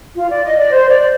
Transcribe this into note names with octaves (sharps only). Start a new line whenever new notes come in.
F4
D5
D#5
D5
C5
D5